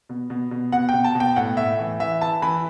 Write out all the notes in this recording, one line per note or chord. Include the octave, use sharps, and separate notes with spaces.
B2
B2
B2
B2 F#5
B2 G5
A5
B2
G5
A2 F#5
A2 E5
E3
E3 E5
E3 A5
E3 B5